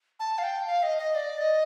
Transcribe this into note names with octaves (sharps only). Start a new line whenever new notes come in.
A5
F5
G5
F5
D#5
D#5
D5
D#5